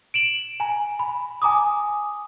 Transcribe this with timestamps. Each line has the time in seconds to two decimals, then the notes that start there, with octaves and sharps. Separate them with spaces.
0.14 D7 E7 F#7
0.60 G#5 A#5
0.99 B5
1.42 G#5 A#5 D6 D#6